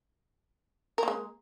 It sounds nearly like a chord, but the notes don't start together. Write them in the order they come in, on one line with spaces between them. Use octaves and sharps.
A#4 A#3 G#3